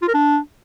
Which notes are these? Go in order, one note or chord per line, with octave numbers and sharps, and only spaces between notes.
F4
A#4
D4